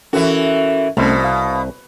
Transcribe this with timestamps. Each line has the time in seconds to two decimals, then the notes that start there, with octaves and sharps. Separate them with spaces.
0.13 E3 C#4 F#4 A4 A#4
0.97 C2 B2 A3 C#4 C5
1.20 F5 D#6